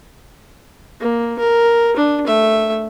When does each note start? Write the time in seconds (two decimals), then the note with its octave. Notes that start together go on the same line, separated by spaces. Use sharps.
1.00 A#3
1.39 A#4
1.96 D4
2.27 A3 E5